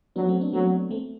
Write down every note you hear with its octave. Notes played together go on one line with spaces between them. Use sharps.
F#3 B3 D4
A3 C4
B3 D4
F#3 A3 C4
A3 C4